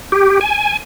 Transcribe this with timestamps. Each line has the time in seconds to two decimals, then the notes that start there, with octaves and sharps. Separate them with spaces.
0.12 G4
0.41 G#5